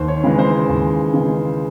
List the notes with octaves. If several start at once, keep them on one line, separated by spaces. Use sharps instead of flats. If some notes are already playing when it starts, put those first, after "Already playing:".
Already playing: D#2 C5
C#5
C#3 E3 G#3
C5
D#2
C#3 E3 G#3